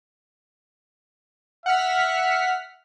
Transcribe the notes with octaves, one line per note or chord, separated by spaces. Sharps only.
E5 F#5 F6 B6